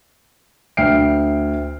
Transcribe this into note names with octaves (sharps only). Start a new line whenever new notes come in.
D2 E5 G5 F6 C7 D7